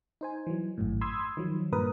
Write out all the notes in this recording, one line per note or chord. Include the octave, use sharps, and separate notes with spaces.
D#4 C5 G#5
E3 F#3
G#1 F#2 A2
B5 C6 D#6 E6 G#6
D#3 F3 F#3
G2 A#2 A#4 B4 D#6